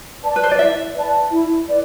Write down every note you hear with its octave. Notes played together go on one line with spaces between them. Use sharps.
B4 D5 A5
B4
C5
D5
E4 E5
B4 D5 A5
E4
B4 D5